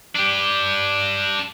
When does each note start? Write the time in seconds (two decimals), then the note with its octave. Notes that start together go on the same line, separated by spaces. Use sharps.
0.16 D4 G4